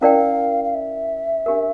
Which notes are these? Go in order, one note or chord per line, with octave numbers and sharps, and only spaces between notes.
C#4 E4 A#4 D5 F5 G5
F5
E5
D4 G4 A#4